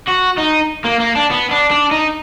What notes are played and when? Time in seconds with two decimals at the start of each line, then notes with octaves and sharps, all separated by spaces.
0.08 F#4
0.38 D#4
0.85 A#3
1.00 A#3
1.15 D4
1.31 B3
1.51 D4
1.71 D4
1.91 D#4